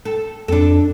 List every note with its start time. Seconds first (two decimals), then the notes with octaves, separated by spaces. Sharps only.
0.05 A4
0.48 F2 D4 A4